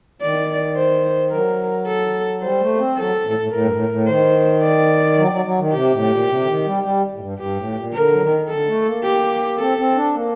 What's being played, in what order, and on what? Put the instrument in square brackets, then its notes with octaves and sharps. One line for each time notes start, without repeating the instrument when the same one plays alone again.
[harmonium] D#3 [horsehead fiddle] D5
[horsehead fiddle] C5
[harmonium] F#3 [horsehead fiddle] A#4
[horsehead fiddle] A4
[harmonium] G3 [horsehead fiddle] C5
[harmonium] A3
A#3
C4
[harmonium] F#3 [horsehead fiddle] A4
[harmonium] A2
A2
[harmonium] A2 [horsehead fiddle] A#4
[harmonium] G2
A2
A2
[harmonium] D#3 [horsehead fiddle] C5
[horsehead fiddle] D5
[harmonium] F#3
F#3
F#3
D#3
[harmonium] C3 [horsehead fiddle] G4
[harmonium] A2
A#2
C3
D3
D#3
G3
G3
A2
G2
[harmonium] G2 [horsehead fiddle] G4
[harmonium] A2
A#2
[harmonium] D3 [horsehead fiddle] A#4
[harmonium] F#3
D#3
[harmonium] D3 [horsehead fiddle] A4
[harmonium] A3
A#3
[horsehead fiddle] G4
[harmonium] C4 [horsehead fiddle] A4
[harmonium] C4
D4
A#3